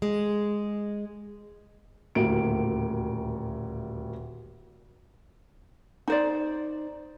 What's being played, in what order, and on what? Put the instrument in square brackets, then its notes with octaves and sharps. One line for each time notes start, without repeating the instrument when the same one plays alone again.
[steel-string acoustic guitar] G#3
[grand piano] D#1 D2 A2 A#3 F#4 D7
[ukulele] D#4 C5 D5